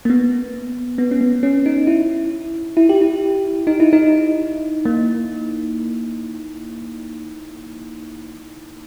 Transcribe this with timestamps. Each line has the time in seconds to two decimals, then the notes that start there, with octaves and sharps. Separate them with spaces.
0.05 A#3
0.10 B3
0.98 B3
1.11 C#4
1.21 B3
1.43 C#4
1.66 D#4
1.87 E4
2.77 E4
2.89 G4
3.01 E4
3.67 D#4
3.80 E4
3.93 D#4
4.85 A#3